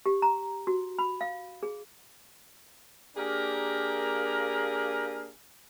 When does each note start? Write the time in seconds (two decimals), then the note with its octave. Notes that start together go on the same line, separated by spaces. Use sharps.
0.06 G4
0.22 A#5
0.67 F#4
0.99 B5
1.21 F5
1.63 G#4
3.17 A#3 D4 G4 G#4 A#4